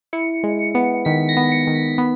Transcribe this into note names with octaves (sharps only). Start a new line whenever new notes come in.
E4 C#7
G#3
C#7
B3
D#3 B6
A#6
B3
C#7
D#3
B6
B3